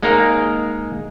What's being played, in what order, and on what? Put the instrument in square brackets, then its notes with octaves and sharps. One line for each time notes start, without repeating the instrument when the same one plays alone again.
[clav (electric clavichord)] G#3 A#3 D#4 G#4 A#4